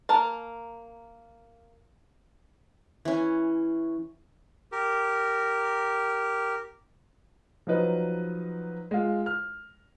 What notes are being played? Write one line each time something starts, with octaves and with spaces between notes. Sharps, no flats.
A#3 A#4 A5
E3 C#4
G4 A#4
F3 F#3 D#4 B4 D#5
G#3 F4
F6